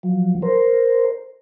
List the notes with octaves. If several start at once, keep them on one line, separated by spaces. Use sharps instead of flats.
F3 F#3
A#4 C5